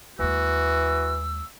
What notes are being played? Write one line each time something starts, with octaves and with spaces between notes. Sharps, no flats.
D#2 E3 G#3 F#4 E6